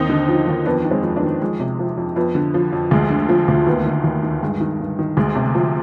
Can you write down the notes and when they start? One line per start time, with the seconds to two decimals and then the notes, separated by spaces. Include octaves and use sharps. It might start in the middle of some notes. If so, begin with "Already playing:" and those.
Already playing: D#2 C4 D#4
0.09 D3
0.28 F3
0.48 D#2
0.66 F2 B3 D4
0.84 D#3
0.91 G#3 C4
1.03 F2
1.16 B3 D4
1.23 D#3
1.42 F2 G#3
1.60 C3
1.79 F3
1.97 F2
2.16 F2 B3
2.35 D3
2.54 F3
2.73 F2
2.91 D2 G#3
3.10 D3
3.29 F3
3.48 D2
3.66 D#2 B3
3.86 D#3
4.04 D#2
4.23 D#3
4.42 G2 G#3
4.61 D#3
4.80 G2
4.99 D#3
5.17 D2 G#3
5.35 C3
5.55 F3